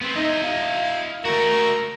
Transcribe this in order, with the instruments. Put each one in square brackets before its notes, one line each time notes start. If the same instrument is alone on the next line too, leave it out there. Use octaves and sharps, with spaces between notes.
[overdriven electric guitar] B3 C4
[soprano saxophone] D#4 [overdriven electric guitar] E4 D#5
[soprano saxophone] F5
[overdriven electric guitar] A3 F#4 [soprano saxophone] A#4